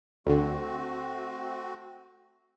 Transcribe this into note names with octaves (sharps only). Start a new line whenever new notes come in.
D2 D3 A3 C4 F#4